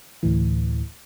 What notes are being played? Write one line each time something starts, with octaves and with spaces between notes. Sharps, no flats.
D2 A2 E3